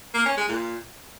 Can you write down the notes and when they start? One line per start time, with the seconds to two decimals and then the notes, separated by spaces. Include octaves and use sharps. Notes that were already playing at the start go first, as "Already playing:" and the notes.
0.14 A#3
0.26 C#4
0.37 G#3
0.49 A#2